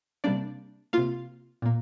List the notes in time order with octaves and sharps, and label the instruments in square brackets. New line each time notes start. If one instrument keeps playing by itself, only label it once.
[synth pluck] C3 G3 A#3 D4 D5
C3 A#3 F4 F5
A#2 A#3